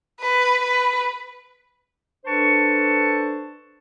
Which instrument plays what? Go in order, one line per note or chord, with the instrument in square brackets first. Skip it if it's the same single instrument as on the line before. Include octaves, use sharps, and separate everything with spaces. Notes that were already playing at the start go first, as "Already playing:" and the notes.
[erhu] B4
B4
[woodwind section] D4 A4 B4 C5 A5 C#6